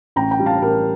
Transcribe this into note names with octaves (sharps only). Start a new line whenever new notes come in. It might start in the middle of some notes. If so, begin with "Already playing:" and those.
A1 G5 A#5
G5 A#5
G3
F5 A5
A1 G4 A#4